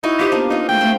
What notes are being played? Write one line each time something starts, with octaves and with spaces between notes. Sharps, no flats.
D#4 E4 F#4 D5
F4 G4 C5
A#3 B3 D4
C4 D#4 F4
G#3 A3 G5
A3 C4 C6